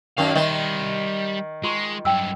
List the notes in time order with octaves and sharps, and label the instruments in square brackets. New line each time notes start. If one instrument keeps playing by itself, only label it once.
[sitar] F#2 D#3 [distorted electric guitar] F5
[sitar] D#3 [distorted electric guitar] G3 C6 [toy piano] C#5 D#5 E5
[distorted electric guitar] G#3 [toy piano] F4 C6 C#6
[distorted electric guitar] G2 F#3 [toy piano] G5 E6